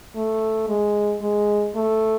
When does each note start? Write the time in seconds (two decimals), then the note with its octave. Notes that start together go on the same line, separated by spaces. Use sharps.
0.16 A3
0.68 G#3
1.21 G#3
1.75 A3